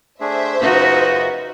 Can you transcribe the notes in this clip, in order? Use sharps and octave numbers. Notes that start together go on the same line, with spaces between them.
A3 D4 G#4 C5 E5
F#2 C#3 D#4 F4 F#4 B4